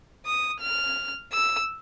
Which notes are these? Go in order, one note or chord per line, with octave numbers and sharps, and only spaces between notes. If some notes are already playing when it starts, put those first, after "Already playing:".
D#6
F6
E6